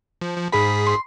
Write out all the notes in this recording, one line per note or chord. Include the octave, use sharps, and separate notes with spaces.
F3
F3
G#2 G#4 B5 B6
C6